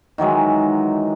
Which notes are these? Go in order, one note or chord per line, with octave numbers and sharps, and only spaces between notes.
D#3 E3 F#3 G#3